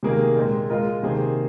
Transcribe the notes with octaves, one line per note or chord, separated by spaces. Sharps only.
C3 D#3 A#3 G#4
A#2 G#3 C4
G#3 F4 A#4 D#5
C3 D#3 A#3 G#4 C5